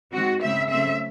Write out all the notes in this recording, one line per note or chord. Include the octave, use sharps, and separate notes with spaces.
D#3 G#3 C4 F#4
C#3 G#3 C4 E5
C#3 F#3 A3 C4 E5